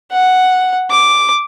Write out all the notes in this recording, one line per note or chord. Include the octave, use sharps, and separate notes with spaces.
F#5
D6